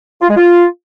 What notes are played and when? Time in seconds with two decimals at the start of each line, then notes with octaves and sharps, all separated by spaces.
0.22 F4
0.29 G#3
0.37 F4